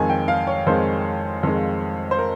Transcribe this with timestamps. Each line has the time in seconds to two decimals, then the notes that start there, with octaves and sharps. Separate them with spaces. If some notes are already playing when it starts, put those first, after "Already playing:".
Already playing: F2 D#3 G#3 G#5
0.10 G5
0.28 F5
0.47 C#5
0.66 F2 D#3 G#3 C5
1.43 F2 D#3 G#3
2.11 C5
2.19 A#4